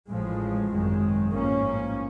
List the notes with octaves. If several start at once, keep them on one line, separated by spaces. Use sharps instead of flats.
A1 A2 F3 G#3
G#1 F#2 D#3 G#3
A1 G#2 F3 A#3 C#4